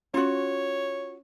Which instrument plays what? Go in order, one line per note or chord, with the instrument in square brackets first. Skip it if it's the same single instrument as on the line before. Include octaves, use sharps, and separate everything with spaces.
[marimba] C#4 [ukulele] F4 F#4 [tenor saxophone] C#5